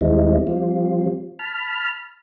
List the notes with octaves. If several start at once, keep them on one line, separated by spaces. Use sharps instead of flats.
D#2 G3 G#3 C4 D#4 E4
F3 G3 C4 F4
A5 B5 F6